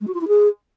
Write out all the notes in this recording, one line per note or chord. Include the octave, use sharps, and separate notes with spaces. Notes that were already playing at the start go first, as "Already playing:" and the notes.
G#3
F#4
F4
E4
G#4